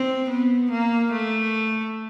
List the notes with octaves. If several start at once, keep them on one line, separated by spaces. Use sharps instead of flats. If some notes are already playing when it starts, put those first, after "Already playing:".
Already playing: C4
B3
A#3
A3